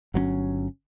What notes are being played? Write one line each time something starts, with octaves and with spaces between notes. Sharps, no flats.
G1 F#3 C4 C#4